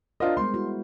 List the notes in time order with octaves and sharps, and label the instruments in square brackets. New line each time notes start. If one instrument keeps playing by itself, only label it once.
[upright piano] D4 F4 D#5 [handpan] A#4 C5
[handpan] G3 G#3 B3 [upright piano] C6
[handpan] E4 F#4